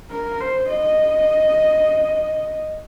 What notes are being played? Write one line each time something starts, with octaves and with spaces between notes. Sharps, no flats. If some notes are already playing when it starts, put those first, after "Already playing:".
A#4
C5
D#5